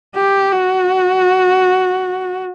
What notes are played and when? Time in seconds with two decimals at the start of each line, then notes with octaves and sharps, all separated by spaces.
0.16 G4
0.52 F#4